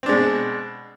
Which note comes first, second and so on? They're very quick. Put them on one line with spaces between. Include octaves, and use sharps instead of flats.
C4 D4 G#3 B2